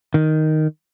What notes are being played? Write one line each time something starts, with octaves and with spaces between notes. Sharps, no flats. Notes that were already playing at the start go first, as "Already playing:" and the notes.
D#3